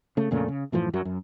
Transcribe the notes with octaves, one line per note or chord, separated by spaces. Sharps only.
C#3 A3
F2 A#2 C#3 A3
C#3
F#2 A2 E3 F3
F#2 F#3
F#2